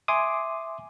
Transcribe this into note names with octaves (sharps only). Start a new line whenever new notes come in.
E5 G#5 C6 D6 D#6